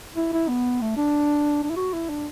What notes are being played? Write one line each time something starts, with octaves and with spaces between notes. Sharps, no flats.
E4
E4
B3
A3
D4
D4
E4
F#4
E4
D4